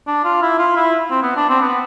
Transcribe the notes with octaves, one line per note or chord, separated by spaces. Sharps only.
D4
F4
E4
F4
E4
C4
B3
D4
C4
B3